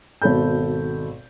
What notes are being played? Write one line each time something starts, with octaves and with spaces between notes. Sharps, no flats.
G#1 B2 A4 B5 G6